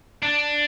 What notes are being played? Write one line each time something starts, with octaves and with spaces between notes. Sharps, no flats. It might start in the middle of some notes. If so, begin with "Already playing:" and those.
D4